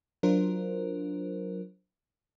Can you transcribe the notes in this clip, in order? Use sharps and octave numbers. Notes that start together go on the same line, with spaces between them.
F#3 D4 F4 A#4 C5